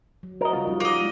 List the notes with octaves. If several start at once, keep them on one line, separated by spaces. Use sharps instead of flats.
F#3
F#4 A#4 D#5
C#3 G3 C#4 F4
F3 G3 D#4
A#3 D#5
F#3 G#3 E4